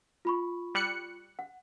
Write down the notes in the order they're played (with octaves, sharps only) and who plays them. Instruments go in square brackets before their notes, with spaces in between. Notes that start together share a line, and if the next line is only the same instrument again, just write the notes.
[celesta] F4 B5 C#6
[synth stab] G3 F#6 C#7
[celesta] F#5